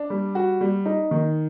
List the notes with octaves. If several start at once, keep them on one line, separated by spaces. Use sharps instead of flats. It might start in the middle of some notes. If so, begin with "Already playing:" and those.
Already playing: D4
G3
F#4
G3
D#4
D#3